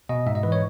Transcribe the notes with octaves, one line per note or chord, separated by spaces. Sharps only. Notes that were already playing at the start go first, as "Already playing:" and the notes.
B2 D#5
G#2 E5
D#5
E3 B4
C#5